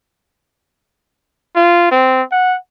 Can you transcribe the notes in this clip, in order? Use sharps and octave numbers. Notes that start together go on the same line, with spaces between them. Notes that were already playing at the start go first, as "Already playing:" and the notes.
F4
C4
F#5